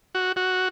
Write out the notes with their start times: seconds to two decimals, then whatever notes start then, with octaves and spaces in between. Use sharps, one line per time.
0.15 F#4
0.36 F#4